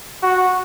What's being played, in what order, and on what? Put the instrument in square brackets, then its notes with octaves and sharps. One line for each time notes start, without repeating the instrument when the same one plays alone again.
[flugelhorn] F#4